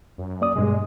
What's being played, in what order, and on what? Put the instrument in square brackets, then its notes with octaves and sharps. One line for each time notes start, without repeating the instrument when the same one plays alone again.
[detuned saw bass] F#2
[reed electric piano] A#3 D5 D#6
[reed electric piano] G2 B2 [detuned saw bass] G#3